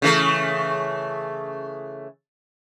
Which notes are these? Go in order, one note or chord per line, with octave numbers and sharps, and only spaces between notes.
C#3 E3 A3